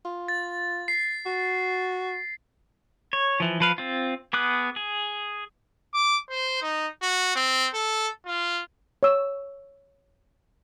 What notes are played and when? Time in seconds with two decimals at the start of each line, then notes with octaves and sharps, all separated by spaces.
0.05 F4
0.28 A6
0.88 C7
1.26 F#4
3.13 C#5
3.40 E3 F3
3.60 F3 B4 F5
3.78 C4 F4
4.33 B3 G#4 D6 D#6 F#6
4.76 G#4
5.94 D6
6.30 C5
6.62 D#4
7.02 F#4
7.35 C4
7.74 A4
8.26 F4
9.03 C#5 E6